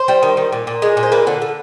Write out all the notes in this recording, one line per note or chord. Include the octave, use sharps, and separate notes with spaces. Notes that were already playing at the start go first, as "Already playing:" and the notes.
Already playing: C5
G3
D#3
D#3
A#2
A#2
G#3
A#2
C5
A#3 B4
D3
D3